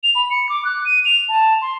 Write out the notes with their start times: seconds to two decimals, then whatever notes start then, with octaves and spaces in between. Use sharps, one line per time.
0.03 F7
0.15 B5
0.30 C#7
0.49 D6
0.65 F#6
0.85 D#7
1.05 F7
1.29 A5
1.62 C6